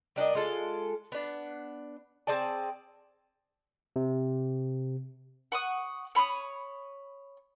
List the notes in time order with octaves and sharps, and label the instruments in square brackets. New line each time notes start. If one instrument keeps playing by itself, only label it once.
[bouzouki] G3 D4 A#4 D#5
G#3 F4 A4
B3 D4
C4 G#4 D5 A5
[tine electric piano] C3
[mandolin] F#5 C#6 D#6
C#5 B5 C6 D#6